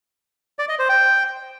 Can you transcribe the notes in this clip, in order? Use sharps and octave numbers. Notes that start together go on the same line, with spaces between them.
D5
D#5
C5
G5